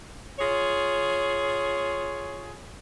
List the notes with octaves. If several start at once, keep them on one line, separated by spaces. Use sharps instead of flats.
F4 G#4 C#5